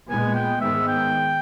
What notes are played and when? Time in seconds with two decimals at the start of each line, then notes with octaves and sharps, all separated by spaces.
0.10 A#2 G#3 B3 G#5
0.35 G5
0.61 G#2 D#3 G#3 B3 E5
0.87 G5